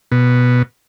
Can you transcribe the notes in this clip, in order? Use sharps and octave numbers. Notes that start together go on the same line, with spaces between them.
B2